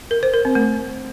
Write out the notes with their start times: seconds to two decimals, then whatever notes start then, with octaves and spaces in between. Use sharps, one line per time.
0.11 A#4
0.23 C5
0.34 A#4
0.45 C4
0.55 A3